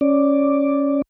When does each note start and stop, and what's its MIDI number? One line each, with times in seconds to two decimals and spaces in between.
0.01 1.02 61
0.01 1.02 74